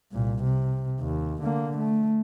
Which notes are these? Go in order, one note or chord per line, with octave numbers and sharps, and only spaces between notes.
C2 A#2
C3
D#2
D3 A#3
A3